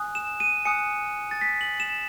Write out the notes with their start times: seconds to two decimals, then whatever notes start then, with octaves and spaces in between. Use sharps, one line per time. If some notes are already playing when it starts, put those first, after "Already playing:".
Already playing: G#5 D#6 F#6
0.15 E7
0.40 D#7
0.65 G#5 D#6 F#6 C#7
1.31 A6
1.41 B6
1.61 F#7
1.80 E7